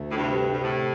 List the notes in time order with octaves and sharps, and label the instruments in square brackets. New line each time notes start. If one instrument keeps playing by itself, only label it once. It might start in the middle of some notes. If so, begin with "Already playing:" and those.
Already playing: [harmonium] D2 A3
[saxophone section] A2
[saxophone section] G2 [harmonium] C3
[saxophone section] G2 [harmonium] C3
[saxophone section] A2